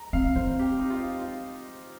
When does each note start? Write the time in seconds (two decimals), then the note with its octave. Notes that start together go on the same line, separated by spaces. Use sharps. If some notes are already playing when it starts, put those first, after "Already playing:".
Already playing: A#5
0.13 C4 F5
0.36 C4 C5
0.59 G4
0.80 D#4
0.90 F4
1.21 F4